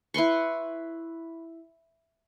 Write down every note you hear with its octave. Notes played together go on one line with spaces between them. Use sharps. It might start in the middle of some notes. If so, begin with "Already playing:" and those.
E4 B4 C6 C#6